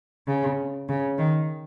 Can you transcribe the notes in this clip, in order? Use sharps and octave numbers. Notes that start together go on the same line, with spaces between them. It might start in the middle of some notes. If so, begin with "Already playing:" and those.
C#3
C#3
D#3